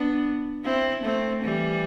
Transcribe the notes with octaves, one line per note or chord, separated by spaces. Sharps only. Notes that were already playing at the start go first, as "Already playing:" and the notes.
Already playing: B3 D4
C4 E4
A3 C4
E3 G3